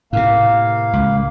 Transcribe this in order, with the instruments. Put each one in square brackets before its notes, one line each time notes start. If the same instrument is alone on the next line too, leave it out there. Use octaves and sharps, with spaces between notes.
[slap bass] A2 C3 [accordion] A#3 F5
[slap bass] C#2